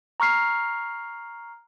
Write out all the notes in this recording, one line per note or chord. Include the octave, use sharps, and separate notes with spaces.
A#5 C#6 F6 C7